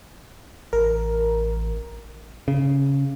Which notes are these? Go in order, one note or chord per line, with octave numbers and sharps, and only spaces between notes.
A1 A#4
C#3